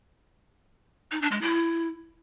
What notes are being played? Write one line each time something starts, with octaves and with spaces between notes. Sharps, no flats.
D#4
D4
G#3
E4